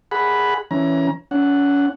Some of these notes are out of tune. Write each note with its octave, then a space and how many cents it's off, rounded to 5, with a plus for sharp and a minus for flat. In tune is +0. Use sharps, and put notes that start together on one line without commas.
G#4 +0 F#5 +0 B5 +0
E3 +0 C#4 +0 A#5 +35
C#4 +35 F#5 +0